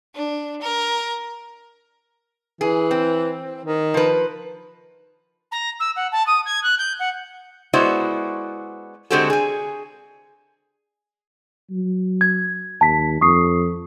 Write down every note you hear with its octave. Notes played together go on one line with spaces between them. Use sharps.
D4
A#4
E3 G#4
C4
D#3
F3 B4
A#5
E6
F#5
A5
D#6
G#6
F#6
G6
F#5
G#3 B3 E4 F#4 C5 D5
D3 G#3 C4 F#4 G4 A4
G#4 G#5
F#3
G#6
D#2 A5 B6
F2 C#6 D#6 C7